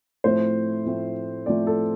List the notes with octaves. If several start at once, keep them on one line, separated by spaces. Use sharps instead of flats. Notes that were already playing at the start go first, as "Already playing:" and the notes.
A2 F3 A3 C4 C5
A2 F3 A3 C4
A2 F3 A3 C4 D5
A4